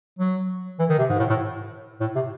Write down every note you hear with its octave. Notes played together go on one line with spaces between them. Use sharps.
F#3
E3
D#3
C3
G#2
A2
A2
A2
C3